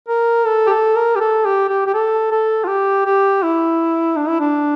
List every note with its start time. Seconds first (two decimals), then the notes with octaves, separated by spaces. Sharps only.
0.08 A#4
0.46 A4
0.67 G4
0.70 A4
0.96 A#4
1.15 G4
1.20 A4
1.45 G4
1.69 G4
1.86 G4
1.94 A4
2.31 A4
2.64 F4
2.68 G4
3.05 G4
3.42 E4
4.16 D4
4.28 E4
4.40 D4